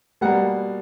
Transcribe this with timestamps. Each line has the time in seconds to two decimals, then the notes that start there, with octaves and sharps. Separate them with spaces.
0.21 B2 G3 A#3 F#5